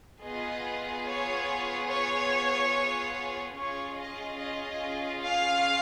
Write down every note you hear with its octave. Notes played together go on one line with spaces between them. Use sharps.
B3 F4 G#4 D#5
C#5
C#5
C#4 F4 G#4 C#5
D#5
D#5
F5